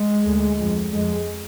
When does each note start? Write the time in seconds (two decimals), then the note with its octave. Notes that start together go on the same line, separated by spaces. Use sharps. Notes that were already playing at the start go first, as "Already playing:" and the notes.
Already playing: G#3
0.27 D2
0.59 F2
0.93 F2 G#3